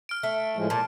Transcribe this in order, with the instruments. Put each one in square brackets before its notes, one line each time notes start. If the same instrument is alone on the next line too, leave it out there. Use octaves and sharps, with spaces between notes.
[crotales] F6 D7
[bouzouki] A3
[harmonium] A2 F3 G#3
[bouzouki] A#2 [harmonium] A5